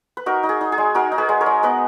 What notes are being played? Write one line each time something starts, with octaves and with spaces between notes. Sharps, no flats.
B4
D#4 F#4 A#4
D#4
G#4
D#4
G#4
G#3
D#4 F#4 A#4
D#4
G#4 B4
G#3
A#4 C#5
G#3
B3 B4 D#5